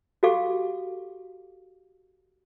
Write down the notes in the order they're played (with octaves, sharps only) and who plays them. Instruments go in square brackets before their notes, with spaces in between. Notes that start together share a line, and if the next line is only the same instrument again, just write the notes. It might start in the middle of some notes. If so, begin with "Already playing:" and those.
[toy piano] F#4 G4 A4 F5 D6